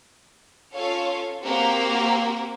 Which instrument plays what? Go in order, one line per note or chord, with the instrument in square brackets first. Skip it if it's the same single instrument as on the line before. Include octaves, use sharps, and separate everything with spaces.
[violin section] C#4 F4 A4 C#5 F5
A#3 C4 F#4 G4 A#4 C5